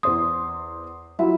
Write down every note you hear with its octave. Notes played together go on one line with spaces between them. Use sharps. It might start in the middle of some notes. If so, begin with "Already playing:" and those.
E2 C5 C6 D#6
F#3 E4 F4